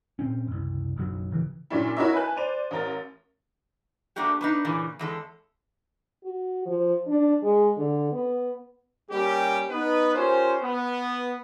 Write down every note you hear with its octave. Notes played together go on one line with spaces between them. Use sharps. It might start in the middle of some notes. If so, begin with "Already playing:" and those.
A#2 C4 C#4
F#1 C2
F#1 B1 F#3
G#1 C#3 E3
A#2 C#3 F#3 C#4 D4 E4
E4 F#4 A#4 C#5 D#5 E5
B4 G#5 A5 F#6
C5 D5 D#7 F7
A1 A#4 A6
A3 A#3 D4 F#4 G4
B3 D4 D#4
A#2 C#3 E3
E2 G#3 A4
F#4
F3
D4
G#3
D3
B3
G3 A#3 C#4 G4
B3 D#4 B4
C#4 F4 G4 A#4 C5
B3